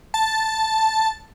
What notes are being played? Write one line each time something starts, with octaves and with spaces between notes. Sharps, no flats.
A5